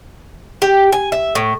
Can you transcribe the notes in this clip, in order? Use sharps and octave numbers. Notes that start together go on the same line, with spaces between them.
G4
G#5
E5
A2